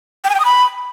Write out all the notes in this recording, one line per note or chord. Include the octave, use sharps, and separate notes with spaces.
G5
G#5
G5
D#6
B5